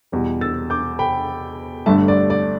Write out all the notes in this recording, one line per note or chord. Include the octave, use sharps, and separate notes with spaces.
E2 B2 G3
E6 A6
D6 G6
G5 B5
G1 G2 D3 A3 E5 A5
D5
D5